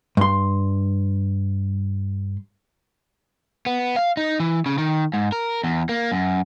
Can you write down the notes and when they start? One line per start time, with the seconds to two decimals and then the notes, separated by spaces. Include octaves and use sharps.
0.17 G2 C6
3.66 B3
3.96 F5
4.17 D#4
4.40 E3
4.66 C#3
4.78 D#3
5.14 G#2
5.32 A#4
5.64 E2
5.89 A#3
6.12 F#2